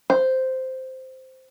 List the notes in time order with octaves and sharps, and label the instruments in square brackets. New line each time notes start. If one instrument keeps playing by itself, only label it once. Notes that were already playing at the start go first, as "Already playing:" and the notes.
[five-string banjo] C5